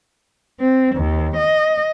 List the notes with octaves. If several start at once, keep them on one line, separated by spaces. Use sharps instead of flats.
C4
D#2
D#5